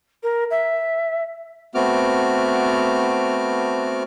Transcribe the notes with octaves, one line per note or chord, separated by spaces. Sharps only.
A#4
E5
A3 B3 C4 F#4 D6 F6